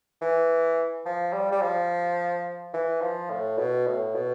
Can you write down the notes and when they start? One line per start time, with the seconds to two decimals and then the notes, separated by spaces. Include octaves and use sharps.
0.21 E3
1.06 F3
1.33 G3
1.52 G3
1.62 F3
2.74 E3
3.01 F3
3.30 A2
3.58 B2
3.87 A2
4.15 B2